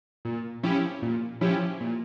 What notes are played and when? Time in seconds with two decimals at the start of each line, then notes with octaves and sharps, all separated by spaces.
0.25 A#2
0.63 F3 C#4 E4 G4
1.02 A#2
1.41 F3 C#4 E4 G4
1.80 A#2